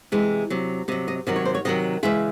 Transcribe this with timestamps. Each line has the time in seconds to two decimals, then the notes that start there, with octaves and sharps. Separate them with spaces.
0.12 C3 E3 G#3
0.50 C3 F#3
0.88 C3 D#5
0.92 F#3
1.08 D#5
1.27 C3 D#3 F#3 D#5
1.36 C#5
1.45 C5
1.54 C#5
1.65 C3 D#3 F#3 D#5
2.03 C#3 E3 G#3 E5